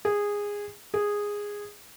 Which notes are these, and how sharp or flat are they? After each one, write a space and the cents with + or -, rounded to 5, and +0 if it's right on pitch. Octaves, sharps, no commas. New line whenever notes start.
G#4 -15
G#4 -10